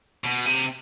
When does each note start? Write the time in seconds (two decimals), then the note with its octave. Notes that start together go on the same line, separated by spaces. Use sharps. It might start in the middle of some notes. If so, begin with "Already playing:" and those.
0.24 B2
0.46 C3